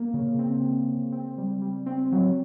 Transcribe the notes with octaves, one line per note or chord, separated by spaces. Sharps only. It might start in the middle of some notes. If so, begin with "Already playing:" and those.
Already playing: A#3
C#3
C4
C#3
C#3
C4
G3
G3
C4
F#3